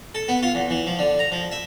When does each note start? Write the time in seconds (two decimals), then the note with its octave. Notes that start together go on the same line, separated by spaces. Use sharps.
0.15 A4
0.28 B3
0.43 F4
0.55 E2
0.70 E3
0.87 F3
0.99 D3
1.19 A#5
1.32 F3
1.52 E5